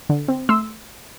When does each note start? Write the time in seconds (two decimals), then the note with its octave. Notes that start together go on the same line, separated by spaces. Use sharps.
0.09 D3
0.28 C4
0.49 A3 C6 E6